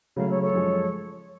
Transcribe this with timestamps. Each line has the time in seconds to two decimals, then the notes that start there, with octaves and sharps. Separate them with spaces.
0.16 C#3 F#3 A3 C#5 F5
0.29 A4 C#5
0.41 A4 C#5
0.53 F#2 F3 G#3